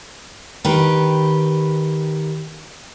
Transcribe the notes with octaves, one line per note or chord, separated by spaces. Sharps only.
D#3 G4 B4